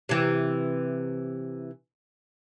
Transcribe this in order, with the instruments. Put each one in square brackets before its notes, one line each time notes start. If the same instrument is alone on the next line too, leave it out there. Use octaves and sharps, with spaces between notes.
[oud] C3 E3